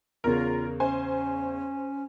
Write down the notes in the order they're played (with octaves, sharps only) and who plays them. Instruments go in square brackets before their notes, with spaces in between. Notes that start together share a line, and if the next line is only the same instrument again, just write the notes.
[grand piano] E2 C#3 [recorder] F4 [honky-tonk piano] A#4
[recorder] C#4 [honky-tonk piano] C5 G#5